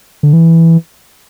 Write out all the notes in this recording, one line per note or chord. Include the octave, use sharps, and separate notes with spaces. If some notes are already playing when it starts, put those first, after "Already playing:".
D3
E3